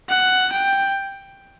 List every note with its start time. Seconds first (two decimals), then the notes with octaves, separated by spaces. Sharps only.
0.09 F#5
0.53 G5